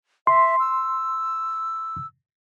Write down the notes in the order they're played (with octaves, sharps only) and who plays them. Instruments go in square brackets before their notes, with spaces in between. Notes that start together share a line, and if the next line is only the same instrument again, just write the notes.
[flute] E5 [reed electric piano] C6
[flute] E6